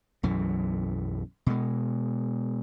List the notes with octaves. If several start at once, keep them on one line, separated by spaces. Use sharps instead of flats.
B1 F#2 E3
B2 G#3